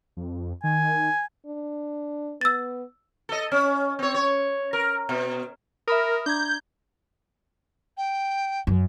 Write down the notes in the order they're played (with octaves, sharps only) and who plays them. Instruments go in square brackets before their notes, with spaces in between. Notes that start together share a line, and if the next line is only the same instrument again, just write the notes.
[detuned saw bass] F2
[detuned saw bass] D#3 [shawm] G#5
[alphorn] D4
[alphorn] B3 [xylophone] E6 A6
[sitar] A4 D#5
C#4
C4 C#5
C#5
A#4
B2
[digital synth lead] A#4 [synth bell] E5 B5 D#6
[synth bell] D4 A#5 G#6 [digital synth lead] G6
[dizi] G5
[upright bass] F#2